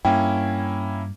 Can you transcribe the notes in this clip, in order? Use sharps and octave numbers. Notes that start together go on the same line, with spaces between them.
G2 A#3 C#4 E4 G5